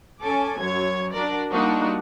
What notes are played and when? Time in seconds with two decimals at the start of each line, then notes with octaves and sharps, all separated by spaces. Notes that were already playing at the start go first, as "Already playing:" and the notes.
0.21 C#4 A4 G#5 D6
0.59 F#2 F#3 C#5 G#6
1.12 D4 F#4 A#4 D5
1.51 G3 A#3 D4 D#4 F4 F#4